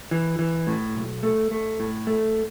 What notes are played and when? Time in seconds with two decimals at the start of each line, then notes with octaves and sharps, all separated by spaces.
0.11 E3
0.39 E3
0.67 A2
0.95 B1
1.23 A3
1.51 A3
1.80 A2
2.07 A3